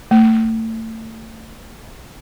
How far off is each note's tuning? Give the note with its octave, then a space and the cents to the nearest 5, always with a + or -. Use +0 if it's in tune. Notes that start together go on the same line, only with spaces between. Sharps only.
A3 +30